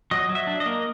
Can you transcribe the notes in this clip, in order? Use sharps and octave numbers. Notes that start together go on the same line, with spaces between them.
F#3 D#5
F#3
E5
D4
D#5
A#3